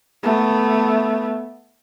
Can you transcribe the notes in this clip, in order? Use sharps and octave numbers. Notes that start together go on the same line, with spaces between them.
A3 B3